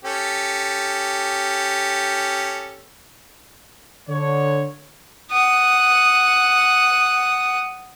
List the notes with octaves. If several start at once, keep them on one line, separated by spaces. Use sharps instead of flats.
C#4 G4 A4
D3 C#5
F#5 D#6